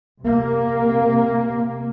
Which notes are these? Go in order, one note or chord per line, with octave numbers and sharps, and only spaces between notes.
C3 A#3